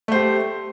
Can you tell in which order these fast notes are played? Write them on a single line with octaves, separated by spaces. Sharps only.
A3 C5 G4